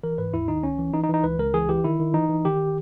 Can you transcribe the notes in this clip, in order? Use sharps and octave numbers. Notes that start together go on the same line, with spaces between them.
E3 A#4
G#2 B4
D#2 E4
D#3 D#4
C#2 C#4
E3
E3 D#4
D#4
E3
D#4
C#2 B4
C#2 A#4
E3 G#4
E3 G4
D#3 E4
D#3
E3 D#4
E3
D#3 G4